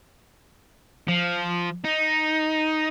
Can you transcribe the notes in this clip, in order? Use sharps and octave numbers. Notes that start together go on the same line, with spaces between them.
F3
D#4